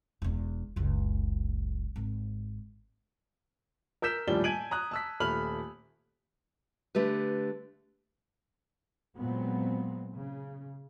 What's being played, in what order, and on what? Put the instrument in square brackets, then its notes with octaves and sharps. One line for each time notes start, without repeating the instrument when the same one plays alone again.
[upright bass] E1 E2
F#1 C#2
G#1
[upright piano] A#4 E6 G6 B6 E7
D#1 A2 F3 G3 D4 G7
G#5 A5 G#6 D7 D#7 F#7
A#5 D#6 F#6
A5 E6 B6
D#1 A3 B5 F6 F#7
[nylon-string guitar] D3 A3 G4 B4
[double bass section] A#2 F#3 G#3 B3 C4
C#3